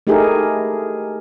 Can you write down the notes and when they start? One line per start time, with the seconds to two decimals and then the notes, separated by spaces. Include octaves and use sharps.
0.07 A3 D#4 E4 G4 G#4 A#4